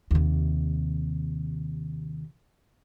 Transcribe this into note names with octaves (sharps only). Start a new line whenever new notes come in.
D#2 C3